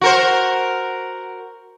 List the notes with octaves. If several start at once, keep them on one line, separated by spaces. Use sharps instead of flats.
F#4 A#4 C5